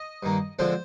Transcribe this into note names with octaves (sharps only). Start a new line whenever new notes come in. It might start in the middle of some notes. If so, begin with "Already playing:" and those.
Already playing: D#5
G2 D#3 A#3
D3 F3 G#3 C4 C5